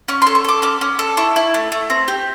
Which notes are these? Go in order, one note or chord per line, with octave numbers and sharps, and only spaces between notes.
C#4 C#6
A4 C6
C#6
A4 D6
C#4 D6
C#4
A4
E4 C#6
E4
A3
A3
C4
G4